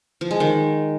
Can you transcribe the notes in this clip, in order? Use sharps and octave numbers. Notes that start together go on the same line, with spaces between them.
F3
G#3
D#3